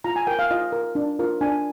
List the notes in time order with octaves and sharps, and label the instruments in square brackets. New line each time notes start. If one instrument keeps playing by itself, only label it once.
[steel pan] F4 A#5
G#5
A#4 G5
F5
F4 D#5
A#4
D4
F4 A#4
D4 G#5